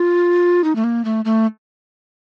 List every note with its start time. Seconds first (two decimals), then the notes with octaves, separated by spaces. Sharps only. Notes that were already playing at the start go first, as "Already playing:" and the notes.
Already playing: F4
0.64 D#4
0.76 A3
0.84 A#3
1.05 A3
1.25 A3